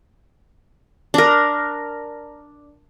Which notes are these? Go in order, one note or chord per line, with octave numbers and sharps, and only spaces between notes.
D4 A#4